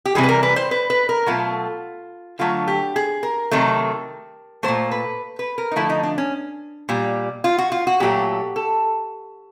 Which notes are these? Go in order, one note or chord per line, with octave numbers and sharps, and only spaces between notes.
G4
C3 E3 G3 G#4
B4
A#4
B4
C5
B4
B4
A#4
B2 F#3 A3 F4
D3 F#3 A3 F4
G4
G#4
A#4
C3 D#3 F#3 A3
F#3 A3 C5
A#2
B4
B4
A#4
D#4
D3 F3 A3 E4
D#4
D4
C#4
A#2 G3
F4
F#4
F4
F#4
A#2 F#3 A3 G4
A4